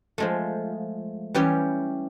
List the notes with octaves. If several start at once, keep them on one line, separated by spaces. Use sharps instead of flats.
F3 G#3 A3
E3 G3 C#4 G4 C#5